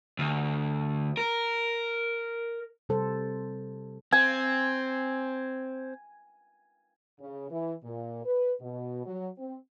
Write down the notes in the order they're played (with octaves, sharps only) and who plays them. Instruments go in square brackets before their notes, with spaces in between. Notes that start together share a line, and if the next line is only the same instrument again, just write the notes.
[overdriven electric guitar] D2
A#4
[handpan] C3 G3 A4 C5
[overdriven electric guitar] C4 [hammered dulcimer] G#5
[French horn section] C#3
E3
A#2
B4
B2
F#3
C4